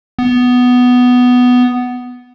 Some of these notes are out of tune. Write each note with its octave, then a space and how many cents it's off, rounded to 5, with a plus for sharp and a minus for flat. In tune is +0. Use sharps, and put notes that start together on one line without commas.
B3 +5